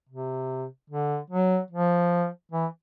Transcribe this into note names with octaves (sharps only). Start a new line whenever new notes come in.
C3
D3
F#3
F3
E3